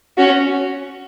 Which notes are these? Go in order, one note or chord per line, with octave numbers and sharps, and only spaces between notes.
C#4 F#4